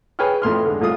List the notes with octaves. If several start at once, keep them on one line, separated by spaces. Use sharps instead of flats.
G#4 B4 C#5 G5 F6
F2 A2 C6 F6
D3 G#3
C2 A2 F4 D#6